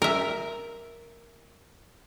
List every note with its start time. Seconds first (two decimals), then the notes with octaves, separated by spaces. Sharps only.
0.02 A#4 E5